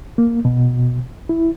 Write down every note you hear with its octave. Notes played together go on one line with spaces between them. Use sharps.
A#3
B2
E4